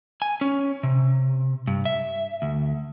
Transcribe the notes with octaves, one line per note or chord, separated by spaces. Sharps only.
G#5
C#4
C3
G2
E5
D2